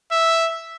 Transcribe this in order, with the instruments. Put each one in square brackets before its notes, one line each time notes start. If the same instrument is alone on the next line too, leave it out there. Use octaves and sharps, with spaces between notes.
[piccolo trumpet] E5